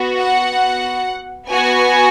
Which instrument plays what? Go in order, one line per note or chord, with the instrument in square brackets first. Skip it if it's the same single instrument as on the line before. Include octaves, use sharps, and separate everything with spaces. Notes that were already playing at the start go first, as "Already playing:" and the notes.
Already playing: [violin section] B3 F#4
F#5
B3 F#4 G#5